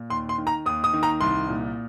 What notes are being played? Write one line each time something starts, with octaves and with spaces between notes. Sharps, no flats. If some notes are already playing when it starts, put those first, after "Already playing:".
Already playing: A#2
D#2 C6
C6
D#3
A#5
D#2 D#6
D#6
D#3
A#5
C2 C6
A#2